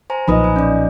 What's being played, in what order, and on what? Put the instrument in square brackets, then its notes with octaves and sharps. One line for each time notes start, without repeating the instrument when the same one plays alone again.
[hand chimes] C5 G#5 A#5
[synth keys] B1 A#2 D#5 [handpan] F3 D#4 B4 [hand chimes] B5 D#6
[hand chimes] G#5
C#4 D5